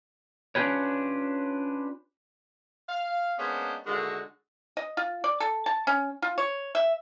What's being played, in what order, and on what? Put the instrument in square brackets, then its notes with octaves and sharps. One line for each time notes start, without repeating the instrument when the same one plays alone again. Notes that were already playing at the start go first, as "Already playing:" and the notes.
[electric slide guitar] C#4 D4 F4 G4 B4 C#5
[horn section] F5
G#3 A#3 B3 C#4 D4 C5
A#2 D3 D#3 G#3 A3 F#4
[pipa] D#5
F4
D5
A4
A5
C#4
F4
C#5
E5